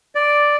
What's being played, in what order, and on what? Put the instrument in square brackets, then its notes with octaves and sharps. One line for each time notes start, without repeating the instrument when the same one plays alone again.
[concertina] D5